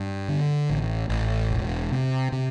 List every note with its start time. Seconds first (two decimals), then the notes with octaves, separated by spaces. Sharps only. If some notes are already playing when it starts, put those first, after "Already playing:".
Already playing: G2
0.28 D3
0.70 A1
1.09 A1
1.51 E1
1.92 C3
2.32 C3